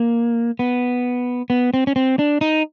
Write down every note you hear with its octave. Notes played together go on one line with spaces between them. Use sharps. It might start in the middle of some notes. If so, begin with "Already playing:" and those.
Already playing: A#3
B3
B3
C4
C#4
C4
D4
D#4